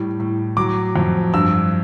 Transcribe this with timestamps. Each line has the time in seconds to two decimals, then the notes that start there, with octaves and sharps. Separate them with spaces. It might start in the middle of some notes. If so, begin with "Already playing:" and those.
Already playing: A2 G3
0.20 A2
0.57 F#3 D6
0.96 F2
1.34 G2 E6